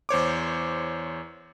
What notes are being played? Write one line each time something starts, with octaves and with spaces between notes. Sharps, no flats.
E2 C5 C#5 D6